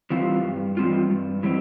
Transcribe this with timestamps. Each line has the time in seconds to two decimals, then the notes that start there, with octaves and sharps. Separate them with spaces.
0.10 E3 G3 C4 F4
0.44 G2
0.77 E3 G3 C4 F4
1.10 G2
1.43 E3 G3 C4